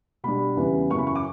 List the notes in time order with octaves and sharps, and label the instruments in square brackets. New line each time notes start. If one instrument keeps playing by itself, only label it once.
[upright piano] B2 G3 D4 B5
E2 C#3 E3 G3 B3
F#2 C#3 E3 C#6
B5
C#6
D6